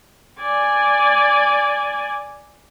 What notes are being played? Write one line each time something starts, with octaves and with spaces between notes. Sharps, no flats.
D5 G#5